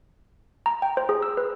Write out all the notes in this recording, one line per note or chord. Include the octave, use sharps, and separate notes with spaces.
A#5
G5
C5
G#4
E6
B4